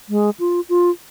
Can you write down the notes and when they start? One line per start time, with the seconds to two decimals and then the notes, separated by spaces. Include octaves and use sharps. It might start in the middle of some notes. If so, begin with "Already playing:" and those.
0.09 G#3
0.40 F4
0.69 F4